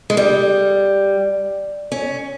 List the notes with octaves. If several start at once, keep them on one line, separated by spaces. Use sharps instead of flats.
G#3
G3
C#4